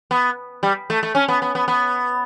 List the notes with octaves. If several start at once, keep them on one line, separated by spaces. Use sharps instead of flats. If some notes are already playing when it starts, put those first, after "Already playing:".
B3
G3
A3
A3
C#4
B3
B3
B3
B3